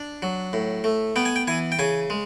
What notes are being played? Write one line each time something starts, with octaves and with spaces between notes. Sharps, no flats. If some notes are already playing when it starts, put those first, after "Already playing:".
Already playing: D4
F#3
A2
A3
B3 G5
G#5
G5
E3 G#5
G5
C#3 G#5
G#3